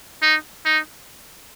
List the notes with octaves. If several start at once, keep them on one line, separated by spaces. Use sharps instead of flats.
D#4
D#4